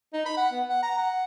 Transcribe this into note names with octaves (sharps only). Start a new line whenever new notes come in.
D#4
B5
F#5
B3
F#5
A#5
F#5